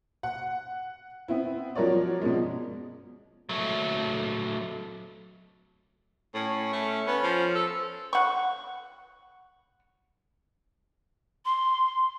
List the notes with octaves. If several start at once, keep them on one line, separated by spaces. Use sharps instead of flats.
F#5
B3 C4 E4
F3 F#3 A#4 C#5 D5
B2 F3 G#3
F#3 A3
A2 C#4
A3
B3 C#4
F3
A4
F#5 C#6
C6